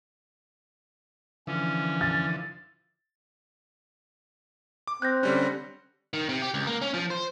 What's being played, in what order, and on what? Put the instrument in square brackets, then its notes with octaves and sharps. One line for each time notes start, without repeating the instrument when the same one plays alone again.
[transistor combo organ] D3 E3 F3 [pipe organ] C#4
[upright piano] A6
[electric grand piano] D6
[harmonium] C4 [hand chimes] F#6 G6 A#6
[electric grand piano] D3 G3 C#4 [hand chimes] C6 F#6
[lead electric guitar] D#3
C3
G4
C#2
A#3
C#4
F3
C5